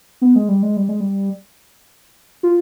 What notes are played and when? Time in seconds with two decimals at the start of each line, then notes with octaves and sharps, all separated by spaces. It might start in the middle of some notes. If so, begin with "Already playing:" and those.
0.22 B3
0.36 G#3
0.49 G3
0.63 G#3
0.77 G3
0.89 G#3
1.00 G3
2.43 F4